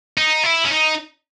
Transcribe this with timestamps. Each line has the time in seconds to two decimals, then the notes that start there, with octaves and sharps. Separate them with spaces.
0.18 D#4
0.44 E4
0.65 C#4
0.70 D#4